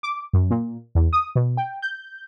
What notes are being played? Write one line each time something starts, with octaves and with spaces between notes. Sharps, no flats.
D6
F#2
A#2
E2
D#6
B2
G5
G6